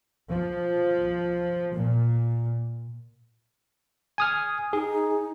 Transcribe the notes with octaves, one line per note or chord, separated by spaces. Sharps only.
F3
A#2
G#5 D#6 F6
D#4 G#4